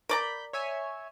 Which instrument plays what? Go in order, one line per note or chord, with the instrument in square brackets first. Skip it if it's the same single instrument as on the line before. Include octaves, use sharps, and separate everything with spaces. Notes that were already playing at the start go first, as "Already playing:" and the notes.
[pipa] A#4 D5 A#5 [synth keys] B5 G6
[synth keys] C#5 E5 G#5